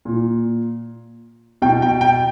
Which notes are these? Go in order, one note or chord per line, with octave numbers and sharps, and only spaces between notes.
A#2
B2 G5
G5
G5